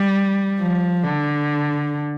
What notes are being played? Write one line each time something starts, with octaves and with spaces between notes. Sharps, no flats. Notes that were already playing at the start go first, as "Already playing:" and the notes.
Already playing: G3
F3
D3